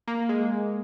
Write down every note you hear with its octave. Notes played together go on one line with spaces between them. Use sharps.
A#3
G#3